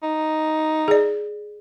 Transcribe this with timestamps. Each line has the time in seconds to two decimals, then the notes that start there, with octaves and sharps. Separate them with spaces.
0.03 D#4
0.88 G#4 D5